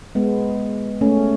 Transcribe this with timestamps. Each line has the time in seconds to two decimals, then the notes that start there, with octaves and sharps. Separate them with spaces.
0.15 G#3 B3
1.01 A3 C#4